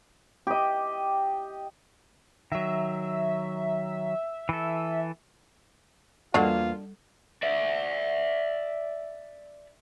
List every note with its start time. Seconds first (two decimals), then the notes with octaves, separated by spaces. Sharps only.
0.47 G4 D#5
2.52 D#3 F#3 E5
4.49 E3 A4
6.34 E2 G3 A#3 D4 F4 F#4 A4 F#5
7.43 D5 E5